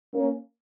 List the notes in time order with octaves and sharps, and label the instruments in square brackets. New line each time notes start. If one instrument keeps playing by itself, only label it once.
[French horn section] A#3 C#4